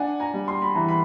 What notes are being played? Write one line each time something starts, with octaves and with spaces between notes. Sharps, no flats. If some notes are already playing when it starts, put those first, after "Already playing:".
Already playing: D4 F#5 G#5
G#5 A#5
G3
C6
B5
E3 A#5
B5